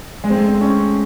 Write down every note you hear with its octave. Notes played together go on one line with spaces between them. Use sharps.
G#3
C4
A3
C4
C#4